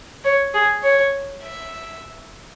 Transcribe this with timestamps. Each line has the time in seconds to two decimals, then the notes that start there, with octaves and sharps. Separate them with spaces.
0.24 C#5
0.54 G#4
0.83 C#5
1.42 E5